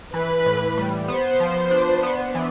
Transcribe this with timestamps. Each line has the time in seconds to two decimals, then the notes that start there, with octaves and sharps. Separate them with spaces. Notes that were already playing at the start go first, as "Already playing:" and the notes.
0.14 E3 B4
0.46 A2
0.78 G3
1.08 B3 C5
1.40 F3
1.71 D4
2.03 B3
2.35 E3